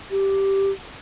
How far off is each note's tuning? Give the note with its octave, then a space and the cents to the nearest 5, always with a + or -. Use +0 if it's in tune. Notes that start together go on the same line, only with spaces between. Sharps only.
G4 -5